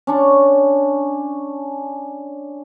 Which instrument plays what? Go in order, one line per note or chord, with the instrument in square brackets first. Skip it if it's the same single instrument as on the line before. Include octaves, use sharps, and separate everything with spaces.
[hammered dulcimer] C#4 D4 C#6